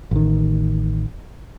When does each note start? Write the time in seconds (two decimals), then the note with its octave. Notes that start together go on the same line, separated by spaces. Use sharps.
0.11 A1 D#3